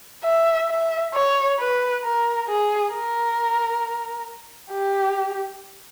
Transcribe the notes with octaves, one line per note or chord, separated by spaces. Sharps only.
E5
E5
C#5
B4
A#4
G#4
A#4
G4